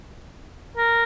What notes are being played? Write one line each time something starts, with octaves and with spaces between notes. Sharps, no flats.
A#4